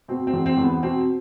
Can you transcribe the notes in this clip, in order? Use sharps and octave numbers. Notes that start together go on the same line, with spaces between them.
B2 C4
C4
E2
C4
E2
B3
B2 C4